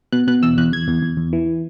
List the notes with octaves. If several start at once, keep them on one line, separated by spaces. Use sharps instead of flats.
B2 F#6
B2 F#6
E2 E6
E2 F#6
E2 G#6
E2
E2
E2
E3